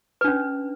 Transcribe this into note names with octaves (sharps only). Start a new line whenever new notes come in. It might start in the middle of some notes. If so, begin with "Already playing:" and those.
C#4 D4 B4